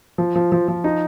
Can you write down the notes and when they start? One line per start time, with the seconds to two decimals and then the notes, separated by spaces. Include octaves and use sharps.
0.18 F3
0.35 F3
0.52 F3
0.68 F3
0.84 D#4